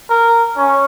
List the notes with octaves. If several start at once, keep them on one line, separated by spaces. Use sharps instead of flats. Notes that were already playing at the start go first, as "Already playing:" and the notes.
A#4
C#4